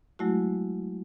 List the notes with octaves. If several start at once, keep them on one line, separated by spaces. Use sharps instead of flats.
F#3 G#3 A3 E4 F#4